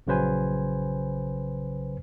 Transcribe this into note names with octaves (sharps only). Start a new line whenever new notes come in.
A#1 C#3 F#3 B4 C5 G#5